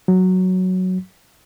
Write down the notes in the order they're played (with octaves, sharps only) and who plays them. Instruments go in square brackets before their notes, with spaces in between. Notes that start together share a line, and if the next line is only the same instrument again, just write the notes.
[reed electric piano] F#3